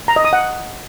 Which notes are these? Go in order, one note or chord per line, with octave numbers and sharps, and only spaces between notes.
A#5
D#5
D#6
F#5